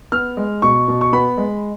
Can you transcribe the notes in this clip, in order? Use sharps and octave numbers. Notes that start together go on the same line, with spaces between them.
B3 F6
G#3
B2 C#6
B2
C#6
B3 B5
G#3